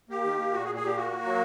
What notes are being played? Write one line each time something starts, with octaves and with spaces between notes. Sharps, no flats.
A#3 G4
D#3
A#3
A#2 F#4
G#4
A#2
G#4
A#2 G4
A#3 F#4
A#3
F#3